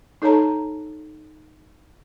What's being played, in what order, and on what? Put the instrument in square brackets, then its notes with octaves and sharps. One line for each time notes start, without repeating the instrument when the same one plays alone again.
[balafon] D#4 A4 C#5 A5 A#5